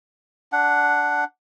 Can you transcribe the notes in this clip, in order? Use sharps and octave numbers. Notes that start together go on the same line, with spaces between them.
D4 F#5